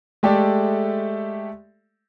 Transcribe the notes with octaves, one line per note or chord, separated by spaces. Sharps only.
G#3 A3 G4 A4 D5 E5